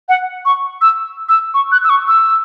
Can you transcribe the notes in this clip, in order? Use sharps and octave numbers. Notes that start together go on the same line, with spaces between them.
F#5
C#6
E6
E6
C#6
F#6
E6
C#6
E6